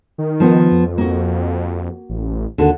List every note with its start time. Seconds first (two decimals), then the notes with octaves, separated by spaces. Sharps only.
0.18 D#3
0.40 F3 B3
0.72 F2
0.98 A#3 F#4
2.09 A1
2.58 D#2 D3 F#4 A4